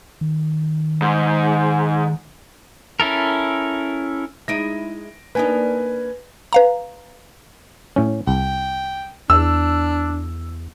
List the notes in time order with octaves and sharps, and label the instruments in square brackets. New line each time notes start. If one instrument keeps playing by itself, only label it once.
[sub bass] D#3
[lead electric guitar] G#2
[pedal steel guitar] C#4 E4 A4 A#4
[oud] G#3 D#4 E4 [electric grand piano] A#6 D7 D#7
[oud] A#3 D4 D#4 [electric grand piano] B4 G#5
[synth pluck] B4 F5 A#5
[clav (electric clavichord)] A2 C#4
[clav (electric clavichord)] C2 [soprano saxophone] G5
[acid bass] E2 [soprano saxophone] D4 [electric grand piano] E6